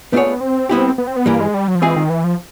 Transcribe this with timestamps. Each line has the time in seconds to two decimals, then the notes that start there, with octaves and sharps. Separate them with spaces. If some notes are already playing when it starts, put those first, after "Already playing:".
0.12 A3 B3 D4 F4 G#4 C#5
0.26 B3
0.41 C4
0.69 G3 B3 E4 G4
0.98 B3
1.07 C4
1.16 B3
1.26 G2 E3 G3 A#3
1.40 G#3
1.54 G3
1.68 F#3
1.75 F3
1.82 E3 G#3 C4 F4 G#4
1.96 D#3
2.10 E3
2.24 F3